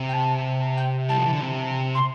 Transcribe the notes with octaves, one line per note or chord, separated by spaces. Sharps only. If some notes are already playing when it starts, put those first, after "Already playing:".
Already playing: C3
G5
A5
G5
G3 A5
F3
E3
D3
C3
C6